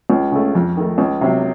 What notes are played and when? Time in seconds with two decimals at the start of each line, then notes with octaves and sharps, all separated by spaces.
0.10 C#2
0.32 C#3 A3
0.55 F2
0.77 D#3 A3
0.98 C#2
1.21 C3 F#3 C4